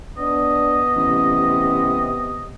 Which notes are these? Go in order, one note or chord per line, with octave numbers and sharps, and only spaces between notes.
B3 D4 D#5
A1 C3